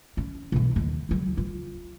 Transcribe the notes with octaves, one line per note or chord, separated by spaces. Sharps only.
C#4
B1 E3
D#2
C#2 F#3
F4